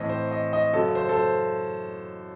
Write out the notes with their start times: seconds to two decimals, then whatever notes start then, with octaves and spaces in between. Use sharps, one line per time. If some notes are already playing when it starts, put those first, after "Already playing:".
Already playing: A2 E3 C4 D#5
0.09 C5
0.31 D#5
0.53 D#5
0.73 F#2 C#3 F#3 A4
0.95 C5
1.09 A4
1.16 C5